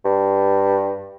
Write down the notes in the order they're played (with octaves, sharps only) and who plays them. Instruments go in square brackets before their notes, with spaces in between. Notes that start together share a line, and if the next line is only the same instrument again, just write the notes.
[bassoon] G2